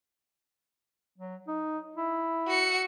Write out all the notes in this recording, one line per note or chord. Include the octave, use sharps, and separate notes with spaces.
F#3
D#4
E4
F#4 C#7